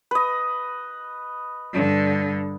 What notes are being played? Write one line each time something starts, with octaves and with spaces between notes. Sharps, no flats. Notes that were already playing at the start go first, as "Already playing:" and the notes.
B4 D#5
G2 D3